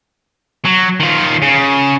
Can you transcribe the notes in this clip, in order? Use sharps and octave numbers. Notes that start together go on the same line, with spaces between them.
F#3
D#3 F4
C#3